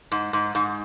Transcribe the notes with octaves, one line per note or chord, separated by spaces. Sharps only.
G#2
G#2
G#2